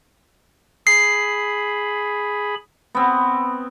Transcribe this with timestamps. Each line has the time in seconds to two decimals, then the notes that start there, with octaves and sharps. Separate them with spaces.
0.87 G#4 B5 C7
2.95 B3 C4